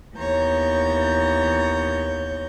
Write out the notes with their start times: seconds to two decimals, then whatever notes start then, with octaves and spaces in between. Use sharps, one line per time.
0.15 D#2 E3 B3 C#5 A#5 G6